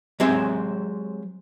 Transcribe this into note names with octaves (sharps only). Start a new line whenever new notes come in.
F#3 G#3 C4 G4 C#5 E5